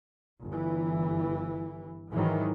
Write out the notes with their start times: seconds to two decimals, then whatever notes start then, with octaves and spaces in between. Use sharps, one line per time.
0.44 G1 E3
2.11 G#2 D#3 E3 F#3